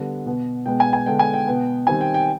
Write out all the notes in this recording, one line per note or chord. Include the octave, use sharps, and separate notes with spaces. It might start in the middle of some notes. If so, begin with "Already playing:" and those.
Already playing: D3 G3 B3
B2 B3
B2 G#3 B3 G5
G#5
G#5
D3 G#3 B3 G5
G#5
G5
B2 B3
D#3 G3 C4 G#5
G5
G5